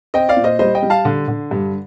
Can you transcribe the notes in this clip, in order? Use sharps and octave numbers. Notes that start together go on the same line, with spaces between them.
C4 D#5 G5
D5 F5
A#2
C5 D#5
G3 C5 D#5
D#5 G5
G3
F5 A5
D3
D3
G2